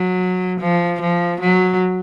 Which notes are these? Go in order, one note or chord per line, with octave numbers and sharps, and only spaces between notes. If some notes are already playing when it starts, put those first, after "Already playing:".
Already playing: F#3
F3
F3
F#3